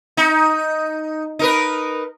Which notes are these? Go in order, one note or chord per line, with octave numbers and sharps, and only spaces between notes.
D#4
D#4 A#4 B4